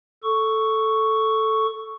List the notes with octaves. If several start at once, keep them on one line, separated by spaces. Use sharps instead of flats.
A4 C#6